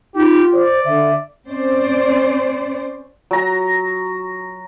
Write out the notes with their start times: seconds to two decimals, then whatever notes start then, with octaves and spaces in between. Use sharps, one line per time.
0.15 D#4 F4 G4
0.53 C5 D5
0.85 D3 E5
1.47 C4 C#4 C5 D5
3.31 F#3 A#5